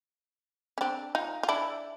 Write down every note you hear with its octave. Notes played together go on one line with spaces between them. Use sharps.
C#4
C4 D4
D#4 F4
F4
D4 E4